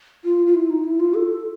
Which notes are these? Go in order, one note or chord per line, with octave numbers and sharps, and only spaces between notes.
F4
F4
E4
D#4
E4
F4
A4